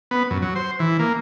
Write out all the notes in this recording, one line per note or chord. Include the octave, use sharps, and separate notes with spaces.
B3
F#2
F#3
C5
E3
A#3